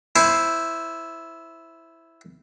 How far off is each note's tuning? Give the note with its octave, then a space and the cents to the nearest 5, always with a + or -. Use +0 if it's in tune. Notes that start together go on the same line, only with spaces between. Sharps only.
E4 +0 C5 +0 G#5 +35